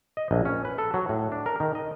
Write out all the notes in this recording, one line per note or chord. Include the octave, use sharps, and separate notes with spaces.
D#5
A#1
C#4
B4
A4
F#3
A2
D4
A#4
D#3
D#5